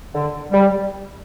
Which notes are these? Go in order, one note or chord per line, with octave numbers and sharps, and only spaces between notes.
D3
G3